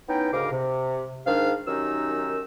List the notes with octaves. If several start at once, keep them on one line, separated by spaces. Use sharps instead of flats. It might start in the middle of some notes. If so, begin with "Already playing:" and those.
B3 C#4 D#4 E4 G5
D2 G#2 C#3 A#4 F5 D6
C3
G#2 D#3 D4 G#4 F5
F#2 D#3 C#4 D#4 G4 E6